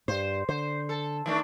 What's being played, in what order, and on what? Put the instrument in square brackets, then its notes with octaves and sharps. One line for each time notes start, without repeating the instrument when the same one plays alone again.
[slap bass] G2 [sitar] C5
[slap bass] D3 [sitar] C5
[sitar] A4
D#3 A3 D4